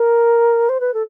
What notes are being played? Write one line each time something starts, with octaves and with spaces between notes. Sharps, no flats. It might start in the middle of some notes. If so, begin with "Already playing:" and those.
Already playing: A#4
C5
B4
A4